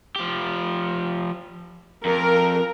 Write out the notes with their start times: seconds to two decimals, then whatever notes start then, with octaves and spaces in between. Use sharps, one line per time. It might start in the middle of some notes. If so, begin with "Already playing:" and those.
0.16 F3 G4
2.05 F2 A#4